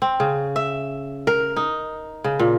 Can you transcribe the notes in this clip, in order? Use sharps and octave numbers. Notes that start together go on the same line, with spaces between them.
C4
C#3
E5
A#4
D#4
C#3
A#2